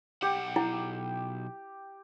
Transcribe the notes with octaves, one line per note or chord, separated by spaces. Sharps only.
B1 G4 F#5
E4